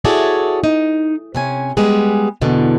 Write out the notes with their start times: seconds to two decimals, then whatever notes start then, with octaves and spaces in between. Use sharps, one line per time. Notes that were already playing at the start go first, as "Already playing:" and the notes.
0.05 E4 F#4 G#4 A4 C#5 D5
0.64 D#4
1.35 C3 C#4 G#5
1.77 G3 G#3 B3 G#4 B4
2.41 E2 B2 D3